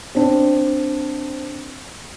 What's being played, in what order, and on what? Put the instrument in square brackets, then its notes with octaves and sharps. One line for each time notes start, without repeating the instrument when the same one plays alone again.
[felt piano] C4 D4